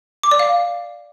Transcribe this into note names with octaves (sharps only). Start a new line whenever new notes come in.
D6
D5
F5